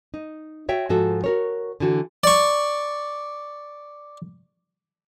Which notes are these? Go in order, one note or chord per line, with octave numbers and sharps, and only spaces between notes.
D#4
F#4 C#5 E5 G5
G#2 F3 F#4 A4
F#4 A#4 C#5
D3 E3 F#4 A4
D5 C#6